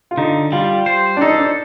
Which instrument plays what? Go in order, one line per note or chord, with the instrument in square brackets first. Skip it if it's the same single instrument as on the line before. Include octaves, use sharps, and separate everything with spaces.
[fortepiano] F4
[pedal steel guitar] D3 [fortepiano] D#4
[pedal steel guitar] G3 [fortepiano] F4
[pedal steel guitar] C5
[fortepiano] D4
[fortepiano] D#4 [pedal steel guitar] A4
[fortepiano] D4